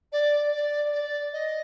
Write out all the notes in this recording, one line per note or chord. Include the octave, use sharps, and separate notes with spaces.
D5
D5
D5
D#5